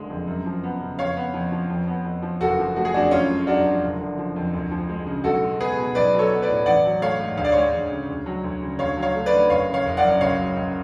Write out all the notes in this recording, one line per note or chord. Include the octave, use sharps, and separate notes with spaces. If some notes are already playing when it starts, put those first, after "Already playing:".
Already playing: F#1 D3 G#3
F2
F#2
F3
B3
C#3
F2 C#5 F5
B3
F2
F3
F2
B3
F2
F3
F#1 F#4 A4
F3
A3 F#4
G#4
F2 D4 F#4
F#2 C#4 F4
G#3
F#2 D4 F#4
F3
F#1
D3
F3
F2
D2
F3
G#3
C#3
B1 F#4 A4
G#3
B3 G#4 B4
B2
B1 B4 D5
F#3
A4 C#5
B3
B4 D5
A2
A1 D5 F#5
F#3
A3 C#5 F5
G#2
D2 F5
D5
G#3 C#5 F5
D2
C#3
D2
F#3
D2
C#3
D2 C#5 F5
F#3
C#5 F5
A3
B4 D5
D3
F#1 C#5 F5
C#3
C#5 F5
F#1
D5 F#5
F#2
C#2 C#5 F5
F#3
C#2